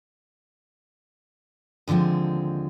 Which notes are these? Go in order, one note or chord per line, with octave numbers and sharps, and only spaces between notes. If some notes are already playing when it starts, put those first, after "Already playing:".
D#2 D3 F3 G#3 C4